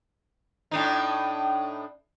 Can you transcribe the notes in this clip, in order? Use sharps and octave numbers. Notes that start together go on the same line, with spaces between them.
A2 D4 D#4